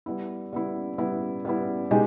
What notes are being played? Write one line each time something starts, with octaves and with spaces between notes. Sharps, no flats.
G3 B3 E4
G3 B3 E4
G3 B3 E4
G3 B3 E4
B2 G#3 D#4 G4